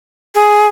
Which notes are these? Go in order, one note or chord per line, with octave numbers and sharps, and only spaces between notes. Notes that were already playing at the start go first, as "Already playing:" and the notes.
G#4